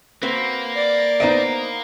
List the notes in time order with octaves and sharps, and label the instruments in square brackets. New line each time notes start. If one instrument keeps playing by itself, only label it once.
[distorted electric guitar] A#3 [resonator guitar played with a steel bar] C4 F#4 B4
[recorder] D5
[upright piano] B3 D7 [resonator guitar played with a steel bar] D#4 C5 D#5